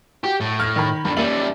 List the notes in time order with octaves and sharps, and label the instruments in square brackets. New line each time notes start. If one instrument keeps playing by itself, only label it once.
[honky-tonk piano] F#4 [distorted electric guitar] G4
[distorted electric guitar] A2
[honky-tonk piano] F6 G#6 A#6
D#3 B5
[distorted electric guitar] G2 D3 [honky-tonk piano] B5
[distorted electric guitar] G3 C#4 [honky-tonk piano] A#3 E5 F#7